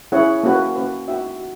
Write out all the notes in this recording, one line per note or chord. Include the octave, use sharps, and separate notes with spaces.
C#4 E4 G#4 C#5 F#5
A#3 C#4 F#4 B4
A#3 C#4 F#4 B4
D#4 F#4 B4 E5 G5
F#4